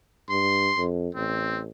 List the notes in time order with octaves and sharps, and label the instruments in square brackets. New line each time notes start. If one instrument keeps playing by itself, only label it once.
[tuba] G2 [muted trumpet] C6
[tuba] F2
[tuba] A1 [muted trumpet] C4